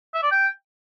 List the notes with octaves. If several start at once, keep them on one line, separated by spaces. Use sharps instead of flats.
E5
D5
G5